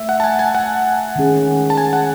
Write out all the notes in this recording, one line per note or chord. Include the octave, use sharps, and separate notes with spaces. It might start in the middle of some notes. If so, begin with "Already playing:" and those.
Already playing: A3 E5
F#5
A5
G#5
G#5
F#5
D#3 G#3 C#4 G#4
A5
G#5
F#5